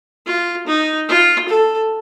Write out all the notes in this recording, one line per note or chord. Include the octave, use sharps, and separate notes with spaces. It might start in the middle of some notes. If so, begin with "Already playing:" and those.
F4
D#4
F4
A4